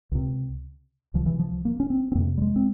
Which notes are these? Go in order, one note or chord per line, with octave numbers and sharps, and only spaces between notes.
C#2 C3
C#2 C3 F3
E3
F3
A#3
C#4
C4
C4
F2 C3 A#3
G3
G#3
C4